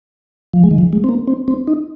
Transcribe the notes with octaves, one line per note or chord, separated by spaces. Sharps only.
F3
G#3
D#3
F3
G#3
C4
A#3
C4
C4
D#4